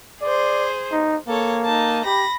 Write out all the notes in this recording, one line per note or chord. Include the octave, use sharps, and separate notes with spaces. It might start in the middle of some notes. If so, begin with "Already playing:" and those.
G#4 C5 D5
D#4
A#3 A4 C#5
D#4 A5
G4 B5 A#6